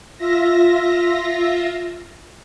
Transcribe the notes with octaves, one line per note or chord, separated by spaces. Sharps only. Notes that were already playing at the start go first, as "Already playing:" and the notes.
F4 E5 A#6